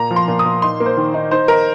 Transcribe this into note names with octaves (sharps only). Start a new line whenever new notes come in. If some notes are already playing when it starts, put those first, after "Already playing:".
Already playing: A#2 A#5
F3
C6
A#2
D#6
A#2
D#4 C6
A#3
C5
D#3
D#4
D#4 C5
D#4 A#4